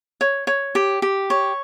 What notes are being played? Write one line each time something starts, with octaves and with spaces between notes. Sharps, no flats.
C#5
C#5
G4
G4
C#5